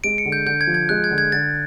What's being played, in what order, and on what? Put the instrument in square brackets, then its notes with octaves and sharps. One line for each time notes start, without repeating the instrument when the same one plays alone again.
[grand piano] G#3 [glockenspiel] D7
[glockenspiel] C#7
[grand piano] D3
[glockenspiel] G6
[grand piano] D3 [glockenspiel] G6
[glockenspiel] G#6
[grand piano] F3
[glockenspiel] G#6
[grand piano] G#3 [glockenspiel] F#6
[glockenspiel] G#6
[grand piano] D3
[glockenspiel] G#6
[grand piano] D3 [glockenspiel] A6